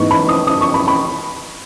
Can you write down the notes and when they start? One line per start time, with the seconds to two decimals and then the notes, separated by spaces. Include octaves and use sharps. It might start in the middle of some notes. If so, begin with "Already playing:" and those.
Already playing: G#2 E3 B3 D#4 C#6
0.11 B5
0.29 D#6
0.47 D#6
0.61 C#6
0.74 B5
0.88 B5